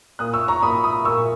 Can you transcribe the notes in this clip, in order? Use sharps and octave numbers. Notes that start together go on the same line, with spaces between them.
A#2 A#3 D#6 F#6
C#6 E6
A#5 C#6
A#2 A#3 B5 D#6
B5 D#6
A#2 A#3 C#6 E6